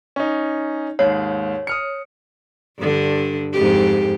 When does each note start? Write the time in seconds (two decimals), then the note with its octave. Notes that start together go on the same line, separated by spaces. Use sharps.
0.16 C#4 D#4
0.99 D#2 G#2 C#5
1.67 D#6 F6 C#7
2.78 G2 D3
3.53 F2 G#2 G4